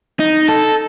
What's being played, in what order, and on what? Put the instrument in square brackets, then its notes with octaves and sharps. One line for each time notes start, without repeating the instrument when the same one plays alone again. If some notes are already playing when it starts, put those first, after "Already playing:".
[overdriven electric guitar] D#4
A4